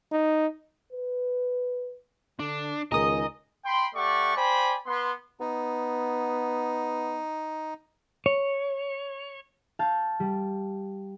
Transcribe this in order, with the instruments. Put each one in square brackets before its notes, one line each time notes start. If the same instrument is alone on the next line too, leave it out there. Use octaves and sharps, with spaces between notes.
[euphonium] D#4
B4
[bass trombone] D3 [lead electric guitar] D4
[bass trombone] C#2 [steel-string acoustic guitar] D#3 D#4 G#4 [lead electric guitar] D#5 [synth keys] A#5 D#6
[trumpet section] G5 B5 C6
A3 G4 D5 F#5 C#6
C5 D5 G5 G#5 B5
B3 C6
[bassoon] B3 [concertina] D#4
[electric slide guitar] C#5
[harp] F5 A5 G6
G3